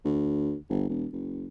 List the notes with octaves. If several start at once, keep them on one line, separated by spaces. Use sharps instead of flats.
D2
G1
E1
F#1